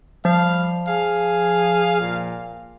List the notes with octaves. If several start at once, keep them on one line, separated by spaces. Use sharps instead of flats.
F3 G3 F5
G#4 F5
A#2